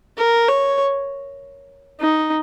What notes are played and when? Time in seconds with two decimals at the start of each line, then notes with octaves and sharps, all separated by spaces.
0.18 A#4
0.49 C#5
2.00 D#4